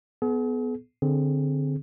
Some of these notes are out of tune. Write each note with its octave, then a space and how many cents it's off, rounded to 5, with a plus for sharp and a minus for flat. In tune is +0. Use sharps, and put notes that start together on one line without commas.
B3 +10 G#4 +40
D3 +0 C4 +0 G#4 +0